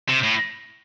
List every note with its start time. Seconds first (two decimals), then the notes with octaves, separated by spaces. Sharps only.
0.09 C3
0.24 A2